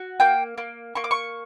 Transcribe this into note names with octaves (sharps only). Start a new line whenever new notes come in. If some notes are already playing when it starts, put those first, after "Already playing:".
Already playing: F#4
A#3 G5
A#3
A#3 C#6
D6
C#6